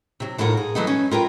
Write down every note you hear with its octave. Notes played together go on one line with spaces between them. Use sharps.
C3 F#3
D#2 A2 A3 F4 A#4 F#5
G#4
E3 F#3 A3 B3 D#4
C#4
F4 A#4 B4 G5